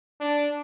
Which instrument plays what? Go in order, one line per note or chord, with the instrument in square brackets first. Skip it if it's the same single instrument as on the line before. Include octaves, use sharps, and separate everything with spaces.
[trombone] D4